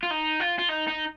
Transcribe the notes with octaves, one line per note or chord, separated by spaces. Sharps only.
F4
D#4
F4
F4
D#4
D#4